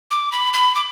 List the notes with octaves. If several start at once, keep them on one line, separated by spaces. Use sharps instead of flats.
D6
B5
B5
D6